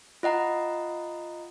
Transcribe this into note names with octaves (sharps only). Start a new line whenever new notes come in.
F4 D#5 F#5 A#5